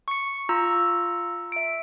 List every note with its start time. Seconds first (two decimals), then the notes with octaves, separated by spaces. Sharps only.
0.08 C#6 C#7
0.49 F4 A#5 E6
1.52 E5 D7